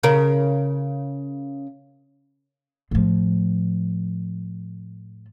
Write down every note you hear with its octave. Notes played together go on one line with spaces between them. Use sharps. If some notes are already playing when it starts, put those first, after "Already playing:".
C#3 A#4
A2 F3